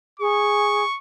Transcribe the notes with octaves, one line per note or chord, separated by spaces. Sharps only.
G#4 C#6